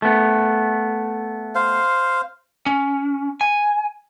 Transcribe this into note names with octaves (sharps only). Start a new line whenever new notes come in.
A3 B3
C5 F5
C#4
G#5